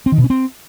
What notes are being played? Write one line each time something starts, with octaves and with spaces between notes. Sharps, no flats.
C4
D#3
B2
C#4
C4